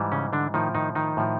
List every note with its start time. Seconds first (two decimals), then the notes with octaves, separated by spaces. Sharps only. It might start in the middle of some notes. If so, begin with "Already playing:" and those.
Already playing: G#2 E3 G3
0.12 C#3 C#4
0.33 D3 D4
0.54 A2 D#3 F3 D#4
0.75 D#3 D#4
0.95 D#3 D#4
1.17 A2 F3